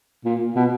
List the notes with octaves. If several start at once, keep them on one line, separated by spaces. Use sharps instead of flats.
A#2
B2